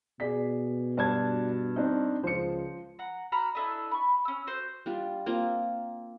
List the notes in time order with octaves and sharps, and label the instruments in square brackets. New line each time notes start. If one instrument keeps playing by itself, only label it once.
[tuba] B2 [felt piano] G#4 D5 B6
[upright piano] G2 A5 G#6 [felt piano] D4 F#4
[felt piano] C4 D4 D#4
[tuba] C#2 [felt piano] F3 [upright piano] C5 C#7
[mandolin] F#5 A#5
F#4 A#5 B5 F6
D4 E4 A4 D#5
B5 C#6
C#4 E6
F#4 C5
[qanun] G3 D4 F4
A#3 C4 F4 A#5